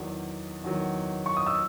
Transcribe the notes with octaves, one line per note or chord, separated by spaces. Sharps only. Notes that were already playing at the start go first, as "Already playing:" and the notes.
Already playing: E2 D#3 F#3
E2 D#3 F#3
C#6
D#6
E6